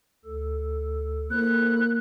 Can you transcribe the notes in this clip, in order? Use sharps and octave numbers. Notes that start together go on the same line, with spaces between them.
D2 A4
A#3 E4 A4 C5 F#6